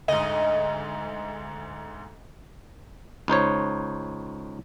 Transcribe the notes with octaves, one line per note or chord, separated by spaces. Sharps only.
D2 G#2 D#5
C#2 D#4 C5 C#5